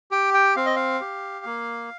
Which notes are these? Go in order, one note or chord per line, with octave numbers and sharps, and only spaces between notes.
G4 G5
G5
C4 F5
D#5
F5
G4
A#3